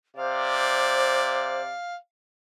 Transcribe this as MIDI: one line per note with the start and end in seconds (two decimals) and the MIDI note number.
0.17 1.74 48
0.17 1.61 72
0.17 1.80 74
0.17 1.96 77